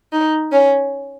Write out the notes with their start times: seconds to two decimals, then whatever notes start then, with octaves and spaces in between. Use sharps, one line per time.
0.12 D#4
0.52 C#4